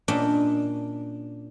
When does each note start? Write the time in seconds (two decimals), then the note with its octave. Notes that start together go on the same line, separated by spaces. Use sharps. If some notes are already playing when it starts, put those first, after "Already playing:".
0.08 A#2 C#4 D4 D#5 G5